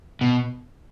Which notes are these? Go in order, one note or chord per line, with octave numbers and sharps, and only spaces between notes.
B2